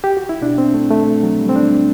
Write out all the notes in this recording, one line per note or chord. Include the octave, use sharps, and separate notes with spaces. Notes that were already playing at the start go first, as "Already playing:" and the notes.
G4
F#4
E4
B2 D4
C4
A3
A3
F#3
G3
C4
D4